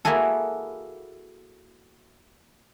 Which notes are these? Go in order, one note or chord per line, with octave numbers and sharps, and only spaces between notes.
A#3 E4 F#4 G#4 A4